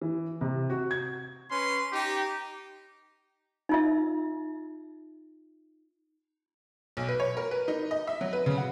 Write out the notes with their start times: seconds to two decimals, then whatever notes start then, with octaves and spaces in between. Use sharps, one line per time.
0.01 E3
0.41 C3
0.70 F#4
0.91 G#6
1.50 C#4 B4 C6
1.91 D#4 G4
3.69 D#4 F4 E5
6.97 B1
7.08 B4
7.20 C#5
7.37 A#4
7.51 B4
7.68 D#4
7.91 D#5
8.07 E5
8.21 F#3
8.33 B4
8.46 C#3
8.58 F#4